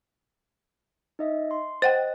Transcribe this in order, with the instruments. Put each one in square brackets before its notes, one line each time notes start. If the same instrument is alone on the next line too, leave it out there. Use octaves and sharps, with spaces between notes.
[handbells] D#4 D#5 E5
C6
[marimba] C5 F#5 G5 [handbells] D#5 F#6